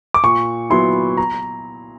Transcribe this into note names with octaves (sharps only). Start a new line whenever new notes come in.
D6
A#2 C#6
F#3 B3 E4 C6
A#5